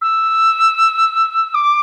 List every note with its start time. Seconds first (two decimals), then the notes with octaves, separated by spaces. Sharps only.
0.01 E6
1.54 D6